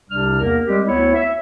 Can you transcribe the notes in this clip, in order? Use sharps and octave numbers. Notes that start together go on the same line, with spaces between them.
C2 C3 G3 D4 F6
E2 A#3 A#4
G3 G#3 C4 G4
D2 B3 E4 C#5
E5